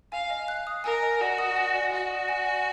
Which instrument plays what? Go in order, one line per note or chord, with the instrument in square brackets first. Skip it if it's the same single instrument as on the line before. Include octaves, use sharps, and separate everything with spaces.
[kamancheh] F5 [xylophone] G#5
[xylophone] D#5
F#6
D#6
[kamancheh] A#4 [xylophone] G#5
[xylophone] D#5
[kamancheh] F#4 [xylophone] D5
[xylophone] D#6
G#5
D5
[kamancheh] F#4 [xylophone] D5
[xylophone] D#6
G#5
D5